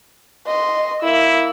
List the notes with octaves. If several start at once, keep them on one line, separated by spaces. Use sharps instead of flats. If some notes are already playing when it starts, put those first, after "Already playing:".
D#5 C6
A#3 E4 E6